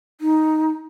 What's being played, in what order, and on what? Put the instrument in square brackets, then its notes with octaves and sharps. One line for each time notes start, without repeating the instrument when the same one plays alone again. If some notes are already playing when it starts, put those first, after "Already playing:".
[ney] D#4